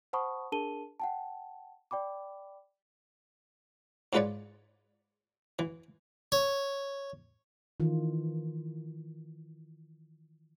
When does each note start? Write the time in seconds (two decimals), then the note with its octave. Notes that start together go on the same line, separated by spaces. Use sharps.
0.13 C5 F#5 A5 B5 C#6 D#6
0.52 D4 G#4 A#4 A5 D#7 G7
1.00 F#5 G5 A5
1.91 D5 G5 B5 D6
4.13 G#2 G#3 F4 B4 C#5 D5
5.59 E3
6.32 C#5
7.80 D#3 E3 F4